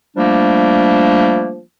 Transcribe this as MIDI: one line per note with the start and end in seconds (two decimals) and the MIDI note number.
0.16 1.60 53
0.16 1.60 55
0.16 1.60 57
0.16 1.60 58
0.16 1.60 62